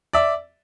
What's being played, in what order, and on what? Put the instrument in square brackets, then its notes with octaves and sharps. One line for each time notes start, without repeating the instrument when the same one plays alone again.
[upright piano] D5 E5